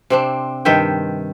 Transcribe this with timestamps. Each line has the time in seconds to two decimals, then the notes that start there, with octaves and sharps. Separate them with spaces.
0.10 C3 C4 D4
0.65 G2 D#3 E5 G5